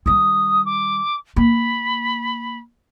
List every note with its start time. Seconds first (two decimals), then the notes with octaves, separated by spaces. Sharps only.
0.06 D#3 G3 D#6
0.65 D6
1.36 A#3 B5